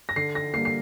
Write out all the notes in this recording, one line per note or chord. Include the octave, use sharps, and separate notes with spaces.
A#6
D3 C7
A#6
G3 A#3 C7
C7